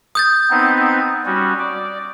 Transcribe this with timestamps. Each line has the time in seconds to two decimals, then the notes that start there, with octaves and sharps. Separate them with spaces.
0.15 D#6 G6 A6
0.50 B3 C4 D#4
1.26 G3 C#4 F#4
1.59 D5